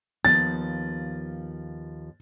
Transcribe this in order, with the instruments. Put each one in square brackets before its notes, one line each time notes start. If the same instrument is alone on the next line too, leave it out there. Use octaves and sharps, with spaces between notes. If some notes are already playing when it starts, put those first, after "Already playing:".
[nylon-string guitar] D#2 F3 B3 [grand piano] A6